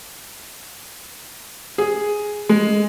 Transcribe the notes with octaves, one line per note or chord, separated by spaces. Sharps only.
G#4
G#3